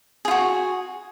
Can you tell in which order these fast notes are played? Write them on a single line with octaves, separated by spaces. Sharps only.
G#4 F4 F#4